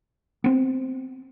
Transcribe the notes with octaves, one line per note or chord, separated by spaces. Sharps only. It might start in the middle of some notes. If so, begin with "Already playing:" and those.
B3 C4